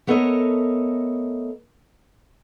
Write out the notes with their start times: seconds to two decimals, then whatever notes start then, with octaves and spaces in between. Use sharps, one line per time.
0.07 A3 B3 A4 A#4 C#5 D#5